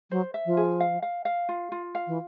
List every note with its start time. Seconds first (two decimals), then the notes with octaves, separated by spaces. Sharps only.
0.10 F#3 C5
0.34 E5
0.45 F3
0.57 G#4
0.80 F5
1.02 F5
1.25 F5
1.49 F4
1.72 F4
1.95 F5
2.07 E3